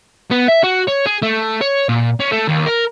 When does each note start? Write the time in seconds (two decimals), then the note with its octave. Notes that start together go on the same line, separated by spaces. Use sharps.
0.31 B3
0.49 E5
0.64 F#4
0.88 C#5
1.07 G#4
1.23 A3
1.61 C#5
1.89 A#2
2.20 C#4
2.32 A3
2.48 D#2
2.66 A#4